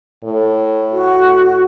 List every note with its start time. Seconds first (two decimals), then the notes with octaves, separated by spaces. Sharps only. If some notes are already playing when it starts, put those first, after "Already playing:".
0.24 A2
0.92 F#4